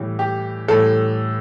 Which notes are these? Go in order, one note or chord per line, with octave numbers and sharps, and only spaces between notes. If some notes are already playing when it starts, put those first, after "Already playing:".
Already playing: A2 E3 G3
G4
A2 E3 G3 A4